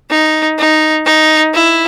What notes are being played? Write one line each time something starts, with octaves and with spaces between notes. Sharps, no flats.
D#4
D#4
D#4
E4